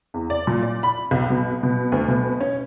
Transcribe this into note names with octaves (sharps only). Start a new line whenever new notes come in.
E2
D5
A#2
D5
B5
B1
B2
B2
D2
B2
C#4